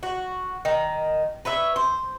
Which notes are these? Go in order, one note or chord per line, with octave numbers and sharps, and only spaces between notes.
F#4
D#3
B4 C#5 E5
C5